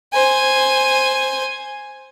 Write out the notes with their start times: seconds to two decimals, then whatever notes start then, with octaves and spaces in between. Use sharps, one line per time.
0.13 C5 G#5